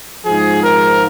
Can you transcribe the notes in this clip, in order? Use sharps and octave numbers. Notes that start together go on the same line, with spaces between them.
G#2 F3 G#4
A#4